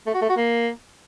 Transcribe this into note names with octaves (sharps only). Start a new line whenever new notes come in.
A3
F#4
A3
F#4
A#3